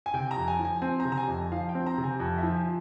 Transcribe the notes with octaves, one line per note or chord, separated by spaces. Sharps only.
G#5
C3 G5
A#5
F2
G#5
F3
G#5
C4 G#5
A#5
C3
A#5
G#5
F2
G#5
F3 F5
G5
C4
A#5
C3
G#5
F2
E5
F3
G#5